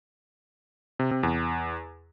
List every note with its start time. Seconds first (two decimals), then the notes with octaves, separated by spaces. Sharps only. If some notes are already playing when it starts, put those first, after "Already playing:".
0.99 C3
1.11 C3
1.23 E2